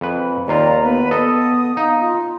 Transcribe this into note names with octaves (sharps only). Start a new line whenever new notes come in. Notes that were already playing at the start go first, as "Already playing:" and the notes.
F2 B4
D#2 F4 D5 A#5
B3 B4
B3 A4 D#5 D#6
D#4 F5
F4